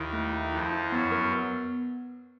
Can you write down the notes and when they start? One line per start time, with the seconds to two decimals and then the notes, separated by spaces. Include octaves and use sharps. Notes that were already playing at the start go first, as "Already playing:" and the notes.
Already playing: D#2 D#3 E4
0.13 A3
0.33 E4
0.53 F2 F3 E4
0.73 E4
0.92 F#2 F#3 B3
1.12 A#4
1.32 B3